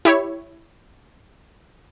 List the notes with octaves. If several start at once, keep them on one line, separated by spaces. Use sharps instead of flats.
E4 G4 C#5